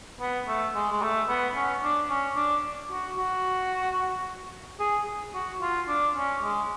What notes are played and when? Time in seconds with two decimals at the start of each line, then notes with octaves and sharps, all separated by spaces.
0.21 B3
0.48 A3
0.75 G#3
0.92 G#3
1.02 A3
1.29 B3
1.55 C#4
1.83 D4
2.10 C#4
2.37 D4
2.91 F#4
3.18 F#4
4.80 G#4
5.34 F#4
5.62 F4
5.88 D4
6.16 C#4
6.43 G#3